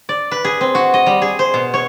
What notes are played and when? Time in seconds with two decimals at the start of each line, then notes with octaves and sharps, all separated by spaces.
0.09 D5
0.31 B4
0.45 G#4
0.61 C4
0.75 F#4
0.94 D#5
1.06 G3
1.22 G#4
1.39 C5
1.54 B2
1.74 C#5